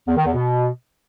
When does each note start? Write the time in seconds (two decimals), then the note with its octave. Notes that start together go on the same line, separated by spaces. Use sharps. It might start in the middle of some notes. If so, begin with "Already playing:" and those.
0.08 E2
0.17 D#3
0.25 E2
0.34 B2